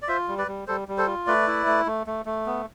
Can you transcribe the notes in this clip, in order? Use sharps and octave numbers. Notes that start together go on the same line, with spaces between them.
D5
F4 C5 E5
G3
B4 D5
G3
G3 A4 C5
G3
A4 C5
F4
A3 B4 D5
E4
A3
A3
A3
A3
B3